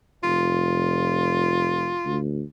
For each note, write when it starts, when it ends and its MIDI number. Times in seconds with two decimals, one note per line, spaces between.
0.23 1.95 29
0.23 2.17 65
2.05 2.43 38